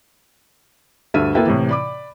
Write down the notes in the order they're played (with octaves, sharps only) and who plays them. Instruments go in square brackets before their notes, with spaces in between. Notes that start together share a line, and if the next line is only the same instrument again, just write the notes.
[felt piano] D2 G2 A4 E5 F6 D#7
A#3 E4 A4 B4 E5 G5
A2 C3 E3
D5 B5 D6